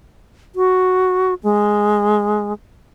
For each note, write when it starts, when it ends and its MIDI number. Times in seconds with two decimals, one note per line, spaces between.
0.56 1.34 66
1.43 2.53 56